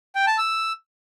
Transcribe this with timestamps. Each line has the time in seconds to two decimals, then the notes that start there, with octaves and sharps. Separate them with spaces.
0.15 G5
0.27 A5
0.38 E6